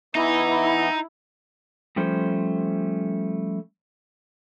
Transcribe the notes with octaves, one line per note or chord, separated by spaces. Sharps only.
E3 B3 D#4 E4
F3 G3 A3 C#4 C5